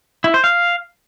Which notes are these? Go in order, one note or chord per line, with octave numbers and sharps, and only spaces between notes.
E4
C5
F5